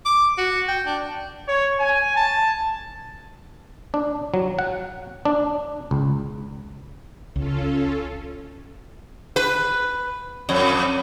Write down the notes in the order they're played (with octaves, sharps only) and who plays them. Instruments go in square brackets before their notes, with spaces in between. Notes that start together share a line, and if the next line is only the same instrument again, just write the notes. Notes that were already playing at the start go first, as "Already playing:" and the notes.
[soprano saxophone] D6
F#4
G5
D4
[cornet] C#5
G#5
A5
[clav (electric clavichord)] D4
F#3
F#5
D4
C#2
[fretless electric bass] C#2 [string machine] C#4 F4 A4
[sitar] B4
F2